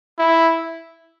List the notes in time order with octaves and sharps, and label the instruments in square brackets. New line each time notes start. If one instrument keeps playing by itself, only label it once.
[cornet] E4